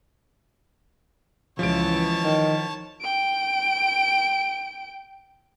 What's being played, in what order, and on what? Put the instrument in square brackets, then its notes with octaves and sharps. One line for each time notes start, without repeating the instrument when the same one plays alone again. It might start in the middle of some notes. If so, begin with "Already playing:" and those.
[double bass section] C#2 E3 [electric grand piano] F3 D7 [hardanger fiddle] C#5 A5
[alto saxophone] D#3
[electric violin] G5 D7